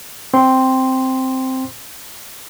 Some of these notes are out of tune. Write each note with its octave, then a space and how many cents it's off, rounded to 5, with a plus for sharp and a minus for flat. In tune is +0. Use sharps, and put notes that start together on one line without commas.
C4 +0 C6 +0